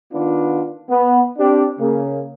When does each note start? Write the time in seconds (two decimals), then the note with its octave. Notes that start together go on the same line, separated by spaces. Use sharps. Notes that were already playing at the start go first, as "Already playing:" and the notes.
0.13 D#3 B3 D4 F4
0.90 B3
1.38 C4 D4 G4
1.80 C#3 A#3